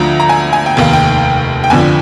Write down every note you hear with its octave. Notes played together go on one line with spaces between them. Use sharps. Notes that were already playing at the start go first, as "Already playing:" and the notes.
Already playing: D2 D3 F3 A#5
A#5
G#5
G#5
G5
F1 D#2 D#3 F5
G5
G5
G1 F2 D3 F3 G#5